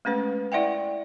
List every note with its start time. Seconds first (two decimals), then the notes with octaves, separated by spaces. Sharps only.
0.05 G#3 A3 C#4 B4
0.52 E4 D5 E5 F#5 G5